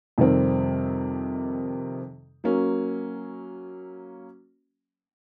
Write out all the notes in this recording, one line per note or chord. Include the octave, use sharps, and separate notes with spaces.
F2 C3 D#3 G3 C4
F#3 A#3 C#4